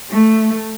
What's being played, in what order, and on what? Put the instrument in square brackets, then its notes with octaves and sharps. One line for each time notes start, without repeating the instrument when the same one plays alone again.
[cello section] A3